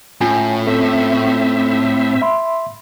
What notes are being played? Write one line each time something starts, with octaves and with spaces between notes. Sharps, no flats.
A2 C#4 F4 G#5
C4 A4 E5
E5 B5 C6